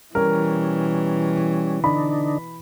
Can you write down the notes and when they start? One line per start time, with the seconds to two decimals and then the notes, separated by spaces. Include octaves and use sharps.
0.15 B2 E3 G3 C#4 A#4
1.84 D3 D4 D#4 B5